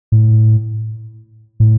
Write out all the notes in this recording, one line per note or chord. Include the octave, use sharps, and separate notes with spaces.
A2
A2